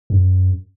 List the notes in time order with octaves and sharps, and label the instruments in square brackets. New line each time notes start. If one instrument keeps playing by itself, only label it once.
[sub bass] F#2